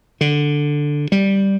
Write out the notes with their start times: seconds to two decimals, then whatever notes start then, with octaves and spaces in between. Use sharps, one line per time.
0.21 D3
1.12 G3